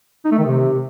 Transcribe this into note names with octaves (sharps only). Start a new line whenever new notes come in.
D#4
A3
D#3
C3